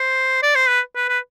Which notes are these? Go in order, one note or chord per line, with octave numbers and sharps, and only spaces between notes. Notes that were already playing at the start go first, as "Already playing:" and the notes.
Already playing: C5
D5
C5
B4
B4
B4